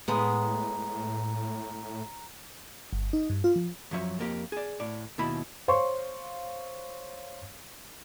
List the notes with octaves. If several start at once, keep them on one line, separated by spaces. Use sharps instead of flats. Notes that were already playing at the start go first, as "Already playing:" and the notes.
A2 G#3 B3 A#5
G1
D#4
G2
F4
F3
F#2 F3 F#3 C#5 E5
F2 A#3 G4
G#4 D5
A2 D5
D#2 B2 E4 B5
C5 C#5 F5 C6 C#6